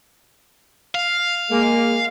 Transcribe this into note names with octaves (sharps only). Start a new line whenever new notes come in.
F5
G#3 A#3